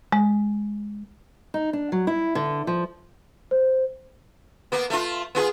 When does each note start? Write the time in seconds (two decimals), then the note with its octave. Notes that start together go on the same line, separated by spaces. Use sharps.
0.12 G#3
1.54 D#4
1.73 D4
1.92 F#3
2.07 E4
2.35 D3
2.67 F3
3.51 C5
4.72 A#3 B3
4.90 A3 F4
5.35 B3 F4 G#4